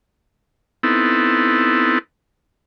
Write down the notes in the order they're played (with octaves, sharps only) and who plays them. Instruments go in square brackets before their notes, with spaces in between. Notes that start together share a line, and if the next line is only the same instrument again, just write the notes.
[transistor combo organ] B3 C4 D#4 E4 A4